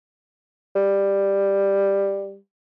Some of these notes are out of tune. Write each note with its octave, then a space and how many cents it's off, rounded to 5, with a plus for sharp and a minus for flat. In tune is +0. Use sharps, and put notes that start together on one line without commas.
G3 +10